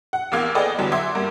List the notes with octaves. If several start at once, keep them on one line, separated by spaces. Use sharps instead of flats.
F#5
A1 E2 A#3 F5 D6 G#6
G#4 A4 B4 D5 D#5 G5
E2 D3 F#3 G3
E5 F#5 C6 D6 G#6
G2 A#3